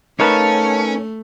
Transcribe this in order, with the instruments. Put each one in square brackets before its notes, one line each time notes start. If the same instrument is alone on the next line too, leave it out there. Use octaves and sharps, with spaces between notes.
[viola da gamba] A3 [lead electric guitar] C#4 [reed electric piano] D#4 A#4 B4 [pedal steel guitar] C#5 F5 A5